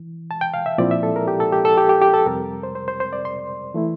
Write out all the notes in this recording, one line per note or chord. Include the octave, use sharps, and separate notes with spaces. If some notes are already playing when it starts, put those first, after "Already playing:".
Already playing: E3
A5
G5
F5
E5
A#2 F3 C4 E4 D5
E5
A4
A#4
G4
A4
G4
A4
G4
G4
G4
A4
F2 C3 G3 C4 A#4
C5
C5
C5
C5
D5
C6
E3 A3 E4